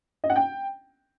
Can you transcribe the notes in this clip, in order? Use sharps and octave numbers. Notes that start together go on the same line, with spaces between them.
D#5
F#5
G5